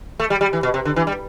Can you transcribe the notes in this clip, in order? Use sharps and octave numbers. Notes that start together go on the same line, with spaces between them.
A3
G3
G3
E3
B2
C3
D3
E3
G3